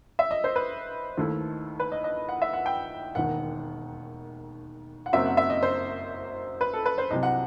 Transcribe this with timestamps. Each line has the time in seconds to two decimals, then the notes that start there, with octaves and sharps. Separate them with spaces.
0.19 E5
0.31 D#5
0.44 C5
0.56 B4
1.17 D#2 D#3 A3 E4
1.80 B4
1.92 D#5
2.04 D#5
2.29 F#5
2.42 E5
2.53 F#5
2.66 G5
3.15 E1 D#2 D#3 F#5
5.06 F#5
5.13 F#1 F#2 F#3 C4 E5
5.25 F#5
5.37 E5
5.50 D#5
5.63 C5
6.61 B4
6.73 A4
6.86 B4
6.98 C5
7.11 C2 C3 F#3 D#5
7.23 F#5